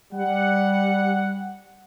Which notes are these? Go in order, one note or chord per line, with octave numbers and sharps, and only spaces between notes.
G3 F#5